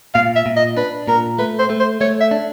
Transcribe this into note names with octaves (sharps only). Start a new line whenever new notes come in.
A#2 F5
E5
A#2
D#5
D4 B4
A#2 A#4
A3 B4
C5
A3
C5
A3 C#5
E5
D4